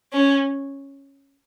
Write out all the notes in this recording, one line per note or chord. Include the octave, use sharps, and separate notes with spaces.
C#4